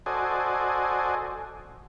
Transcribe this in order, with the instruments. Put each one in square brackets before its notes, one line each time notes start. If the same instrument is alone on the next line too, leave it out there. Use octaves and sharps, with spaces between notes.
[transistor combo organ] F#4 A4 C5 D5 D#5 G#5